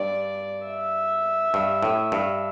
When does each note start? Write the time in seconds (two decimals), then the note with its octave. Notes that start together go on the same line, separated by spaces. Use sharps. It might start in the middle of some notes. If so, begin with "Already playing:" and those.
Already playing: G2 D5
0.67 E5
1.54 G2
1.82 A2
2.12 G2